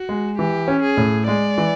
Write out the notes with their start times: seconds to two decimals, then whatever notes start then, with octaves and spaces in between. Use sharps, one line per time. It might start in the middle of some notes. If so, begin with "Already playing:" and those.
Already playing: F#4
0.09 G#3
0.39 E3 G4
0.68 C#4
0.83 G#4
0.97 A2
1.28 G#3 D5
1.58 E3